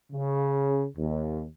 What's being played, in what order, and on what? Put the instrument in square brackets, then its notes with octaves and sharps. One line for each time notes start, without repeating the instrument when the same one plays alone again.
[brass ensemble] C#3
D#2